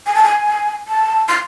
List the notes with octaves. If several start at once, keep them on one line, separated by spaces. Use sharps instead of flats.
G#5
A5
G#5
A5
C6